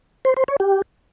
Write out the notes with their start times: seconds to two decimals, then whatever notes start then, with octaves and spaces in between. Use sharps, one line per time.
0.25 C5
0.37 C5
0.48 C#5
0.60 G4